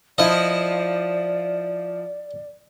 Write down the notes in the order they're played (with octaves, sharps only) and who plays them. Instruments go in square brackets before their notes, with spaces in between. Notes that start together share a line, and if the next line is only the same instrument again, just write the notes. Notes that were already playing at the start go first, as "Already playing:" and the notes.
[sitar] F3 E4 [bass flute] D5 [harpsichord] D#5